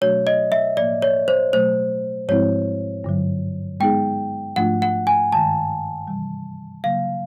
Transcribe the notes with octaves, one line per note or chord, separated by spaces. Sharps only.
B2 F#3 A3 D4 F#4 C#5
D#5
E5
A2 F3 A#3 D5
C#5
C5
B2 F#3 A3 C5
G#2 F3 G#3 C4 E4 C#5
G2 D3 F#3
G#3 B3 D#4 G#4 G5
G#2 F3 A3 D4 F4 F#5
F#5
G#5
G2 D#3 G#3 A5
C3 E3 G3
C#3 F#3 A#3 F5